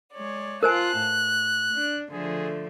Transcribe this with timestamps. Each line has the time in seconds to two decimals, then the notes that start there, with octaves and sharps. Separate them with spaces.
0.14 G#3 C#5 D5
0.63 F4 A#4 C5 F5 G#5 A5 F#6
0.97 A2
1.74 D4
2.13 D3 F3 A3 G#4